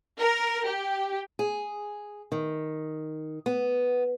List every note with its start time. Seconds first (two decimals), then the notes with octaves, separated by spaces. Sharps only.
0.19 A#4
0.65 G4
1.39 G#4
2.32 D#3
3.46 B3